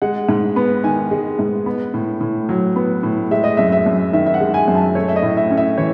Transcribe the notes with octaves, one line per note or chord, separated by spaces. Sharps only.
G#3 F#5
G#2
B3
D#3 G#5
G#3
G#2
B3
A2
A2
F#3
B3
A2
G#3 E5
D#5
F#2 E5
E5
F#2
D#3 E5
E5
F#5
G#3
G#5
F#2
A5
A3 C#5
E5
D#5
A2
E5
C#4
E5
E3 C#5